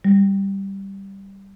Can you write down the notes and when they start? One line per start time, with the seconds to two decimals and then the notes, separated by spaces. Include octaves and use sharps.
0.05 G3